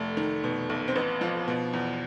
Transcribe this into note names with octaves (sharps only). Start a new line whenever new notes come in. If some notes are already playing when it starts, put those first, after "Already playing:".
Already playing: F1 A3
D#3
B2
B1
C4
A1 B3
F3
B2
E2